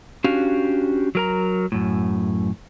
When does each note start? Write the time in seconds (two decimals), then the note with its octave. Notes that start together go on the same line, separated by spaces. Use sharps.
0.24 C#4 D4 F#4 G4 F5
1.15 F#3 A#4 A#5
1.72 F#2 A2